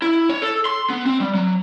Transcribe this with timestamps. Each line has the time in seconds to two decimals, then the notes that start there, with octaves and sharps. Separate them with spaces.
0.02 E4
0.29 C#5
0.42 A4
0.65 C6
0.90 B3
1.06 C4
1.20 G3
1.35 F#3